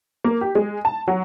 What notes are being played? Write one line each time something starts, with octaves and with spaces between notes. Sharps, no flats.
A#3
G4
G#3
A5
F#3